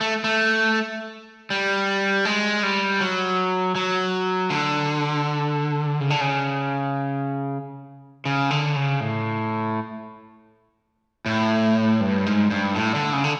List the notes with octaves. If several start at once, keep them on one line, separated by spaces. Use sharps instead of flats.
A3
A3
G3
G#3
G3
F#3
F#3
D3
C#3
D3
C#3
C#3
D3
C#3
A2
A2
G2
G#2
G2
A2
D3
C#3
D3